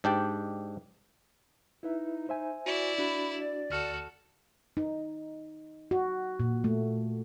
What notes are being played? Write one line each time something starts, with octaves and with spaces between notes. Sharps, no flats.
G#2 D4 G4 D5 G5
D#4 E4 B4 E5
C5 E5 G#5
E4 F#4 D5
D4 F#4 B5
D5
D2 F#4 A4 F6
D#4
F#4
A#2
A3